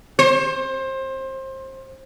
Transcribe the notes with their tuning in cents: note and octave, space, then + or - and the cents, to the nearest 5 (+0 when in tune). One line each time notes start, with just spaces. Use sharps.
C5 +25